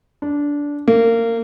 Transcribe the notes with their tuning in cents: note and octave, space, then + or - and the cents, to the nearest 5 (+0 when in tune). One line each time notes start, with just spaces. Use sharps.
D4 -15
A#3 -25